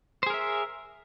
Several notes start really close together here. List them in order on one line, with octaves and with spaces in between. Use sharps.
C5 G#4 A#4 E5